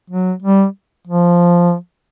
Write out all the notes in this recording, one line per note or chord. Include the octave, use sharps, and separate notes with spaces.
F#3
G3
F3